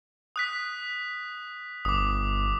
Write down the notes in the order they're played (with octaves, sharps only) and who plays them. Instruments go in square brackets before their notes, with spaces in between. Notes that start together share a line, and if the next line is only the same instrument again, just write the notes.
[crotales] D#6 F#6 B6
[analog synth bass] G1 [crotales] D6 D#6